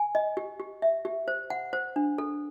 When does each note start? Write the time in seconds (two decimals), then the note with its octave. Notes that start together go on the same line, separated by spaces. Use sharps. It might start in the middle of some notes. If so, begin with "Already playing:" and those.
Already playing: G#5
0.15 D#5
0.37 G4
0.60 G4
0.82 E5
1.05 G4
1.28 C5
1.50 F#5
1.73 C5
1.96 D4
2.18 A4